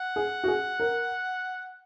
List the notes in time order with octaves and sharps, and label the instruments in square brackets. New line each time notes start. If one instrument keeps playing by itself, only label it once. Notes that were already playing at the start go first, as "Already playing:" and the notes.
Already playing: [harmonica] F#5
[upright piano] G#4
F#4
G#4
A#4